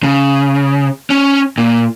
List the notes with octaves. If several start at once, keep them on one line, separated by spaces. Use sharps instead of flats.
C#3
C#4
A#2